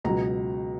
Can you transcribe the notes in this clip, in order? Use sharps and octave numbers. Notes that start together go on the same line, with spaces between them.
C#2 B2 F#3 A#5